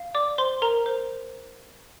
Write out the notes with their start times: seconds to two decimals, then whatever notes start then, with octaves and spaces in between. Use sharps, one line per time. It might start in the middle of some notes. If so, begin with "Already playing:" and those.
Already playing: F5
0.15 D5 D6
0.38 C5 C6
0.62 A#4 A#5
0.86 C5